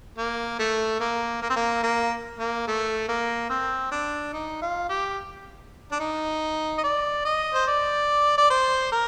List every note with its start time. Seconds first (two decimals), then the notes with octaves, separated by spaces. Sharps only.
0.18 A#3
0.59 A3
1.00 A#3
1.42 A#3
1.50 C4
1.56 A#3
1.83 A#3
2.39 A#3
2.68 A3
3.09 A#3
3.50 C4
3.91 D4
4.33 D#4
4.62 F4
4.89 G4
5.92 D4
6.00 D#4
6.78 D#5
6.84 D5
7.25 D#5
7.54 C5
7.67 D5
8.38 D5
8.50 C5
8.92 A#4